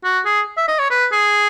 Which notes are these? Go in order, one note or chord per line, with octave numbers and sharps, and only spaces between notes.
F#4
G#4
E5
D#5
C#5
B4
G#4